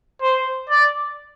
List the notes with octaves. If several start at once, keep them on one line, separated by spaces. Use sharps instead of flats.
C5
D5